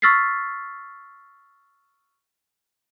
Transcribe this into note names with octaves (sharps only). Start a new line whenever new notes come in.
C#6 E6 F6 A6 B6 C7